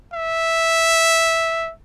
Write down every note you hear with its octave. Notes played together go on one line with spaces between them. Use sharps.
E5